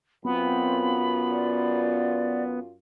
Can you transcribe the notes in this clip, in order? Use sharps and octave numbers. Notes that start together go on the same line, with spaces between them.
F#2 B3 C4 F4 B5
D5